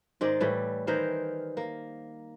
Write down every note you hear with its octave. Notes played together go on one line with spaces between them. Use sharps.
G#2 D#3 G#3 D5
A2 E3 G3
D#3 E3 A#4 C5
A#3